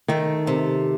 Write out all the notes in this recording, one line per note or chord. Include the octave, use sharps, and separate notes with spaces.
D#3 A3
C3